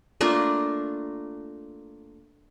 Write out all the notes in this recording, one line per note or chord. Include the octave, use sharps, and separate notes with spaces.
A3 A#3 D4 F4